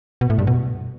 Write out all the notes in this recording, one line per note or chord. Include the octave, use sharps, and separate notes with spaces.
B2
A2
G2
B2